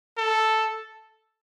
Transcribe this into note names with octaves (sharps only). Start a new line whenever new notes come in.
A4